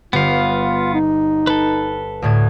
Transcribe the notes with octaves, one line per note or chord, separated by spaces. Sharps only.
G1 B3 F4 G4 F5
D#4
A4 B4
D2 A2 G#6